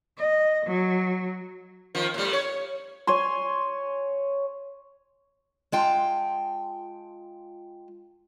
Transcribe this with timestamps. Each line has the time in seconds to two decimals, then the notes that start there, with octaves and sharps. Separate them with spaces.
0.17 D#5
0.66 F#3
1.95 D#3 F3
2.14 A2 G3
2.33 C#5
3.07 C#5 G#5 C6
5.72 G#3 F4 G5 A5